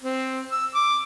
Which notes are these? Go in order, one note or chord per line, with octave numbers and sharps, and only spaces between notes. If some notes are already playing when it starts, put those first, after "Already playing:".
C4
E6
D6